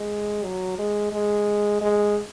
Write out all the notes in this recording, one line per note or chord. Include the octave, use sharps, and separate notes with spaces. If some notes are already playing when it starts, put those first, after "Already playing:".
Already playing: G#3
F#3
G#3
G#3
G#3